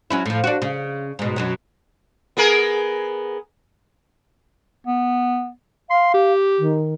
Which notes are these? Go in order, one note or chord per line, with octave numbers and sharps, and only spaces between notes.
F#3 C#4 E4
A2 F3
D4 F#4
C#3
G#2 B2
F#2 B2 F#3
B3 G#4 A#4
B3
F5 C6
G4
D#3